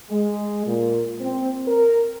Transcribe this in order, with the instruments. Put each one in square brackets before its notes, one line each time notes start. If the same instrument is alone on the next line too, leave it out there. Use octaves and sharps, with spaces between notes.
[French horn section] G#3
A#2
C4
A#4